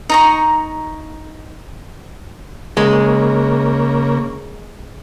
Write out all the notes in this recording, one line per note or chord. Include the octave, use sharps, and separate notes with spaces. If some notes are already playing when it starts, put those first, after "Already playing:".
D#4 A#5 C#6
C#3 G#3 A#3